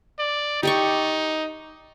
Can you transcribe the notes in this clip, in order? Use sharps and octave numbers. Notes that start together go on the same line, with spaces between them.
D5
D#4 G4 D5 C#6